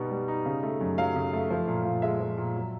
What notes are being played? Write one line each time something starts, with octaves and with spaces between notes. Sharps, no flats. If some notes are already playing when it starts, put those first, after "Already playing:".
Already playing: B2 G3 B3 D#4
G3
D#4
C#3
A3
F#2
F#3 F5
C#3
A3
F3
A#2
A#2
G#3 E5
F3
A#2
F#3